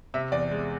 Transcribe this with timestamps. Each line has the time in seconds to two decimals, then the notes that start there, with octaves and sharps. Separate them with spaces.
0.14 C3 E5
0.32 E2 D5
0.51 G#3